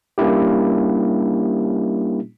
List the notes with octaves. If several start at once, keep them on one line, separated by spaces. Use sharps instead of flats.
G3 A#3 C#4 D4 E4 G4